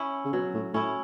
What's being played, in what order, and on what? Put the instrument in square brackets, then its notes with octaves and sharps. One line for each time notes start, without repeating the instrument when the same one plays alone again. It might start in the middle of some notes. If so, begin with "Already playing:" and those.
Already playing: [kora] C#4 E4
[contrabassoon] C#3
[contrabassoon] B2 [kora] F#3
[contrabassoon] A2
[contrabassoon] A2 [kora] C#4 E4